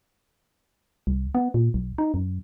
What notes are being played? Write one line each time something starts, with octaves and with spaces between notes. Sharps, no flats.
C2
B3
A#2
B1
D#4
F#2